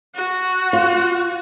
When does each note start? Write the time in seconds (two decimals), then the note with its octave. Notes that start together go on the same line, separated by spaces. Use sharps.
0.15 F#4
0.73 F4